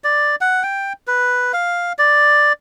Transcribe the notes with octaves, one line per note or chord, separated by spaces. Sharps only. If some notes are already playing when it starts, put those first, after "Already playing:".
D5
F#5
G5
B4
F5
D5